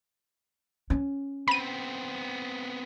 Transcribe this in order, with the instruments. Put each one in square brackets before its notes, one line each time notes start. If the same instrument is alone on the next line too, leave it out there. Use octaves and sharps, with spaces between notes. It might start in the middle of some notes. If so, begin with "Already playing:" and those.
[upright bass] C#4
[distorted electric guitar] B3 C4 [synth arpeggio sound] B5 D#7